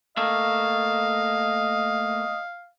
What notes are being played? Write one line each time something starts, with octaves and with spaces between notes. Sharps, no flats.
A3 A#3 D#5 F5